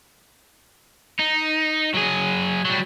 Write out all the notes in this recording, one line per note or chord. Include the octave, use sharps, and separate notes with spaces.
D#4
F#3 G#4
F#3 G3